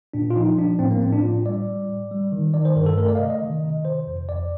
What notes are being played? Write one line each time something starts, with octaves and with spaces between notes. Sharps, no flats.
A#2 D4
F4
F3 D#4
F3 D4
A2 C4
A#3
A2 C4
D4
A2 F4
G3 D5
G3
A2
G3
D#3
D#3 D5
C5
G2 A#4
A4
A3 A#4
D5
F5
C3 D#5
D#5
D#3
C3
C3 C5
F2
F2 D5